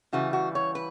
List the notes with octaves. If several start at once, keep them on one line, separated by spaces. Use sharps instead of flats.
C#3 E3 G3 F#4
F#4
C#5
B4